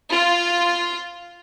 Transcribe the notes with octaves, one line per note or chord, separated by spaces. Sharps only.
F4